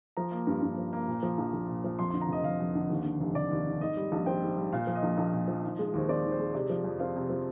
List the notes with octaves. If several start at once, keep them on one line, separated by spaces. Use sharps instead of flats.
F3 A#5
A#3
G2
G2
F3
A#3
A#2
F3
A#1
A#1
A#2
F3
F2 C6
C6
D3
A#5
F1 D#5
F1 F5
F2
D3
D#2
D3
F1
F1 D5
D#2
D3
G#2 D#5
G3
A#1
C4 G5
G#2
G3
A#2 F5
F3
D#5
A#1
A#1
A#2
F3
D#3
G#3
D#2 C5
C4 D5
D#3
C5
G#3
C3 D5
F3
F2
C4 F5
C3
F3